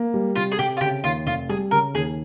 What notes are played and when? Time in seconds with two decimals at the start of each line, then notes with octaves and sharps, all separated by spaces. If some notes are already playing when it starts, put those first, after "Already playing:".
Already playing: A#3
0.14 G3
0.36 C3 F4
0.52 G#4
0.59 C3 G4
0.77 F4
0.81 C#3 G4
1.03 D#2 F4
1.26 F1 F4
1.49 G3 G#4
1.71 C#3 A#4
1.94 D#2 G#4